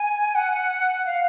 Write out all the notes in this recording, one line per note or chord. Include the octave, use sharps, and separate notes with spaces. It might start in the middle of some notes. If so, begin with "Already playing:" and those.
Already playing: G#5
F#5
F5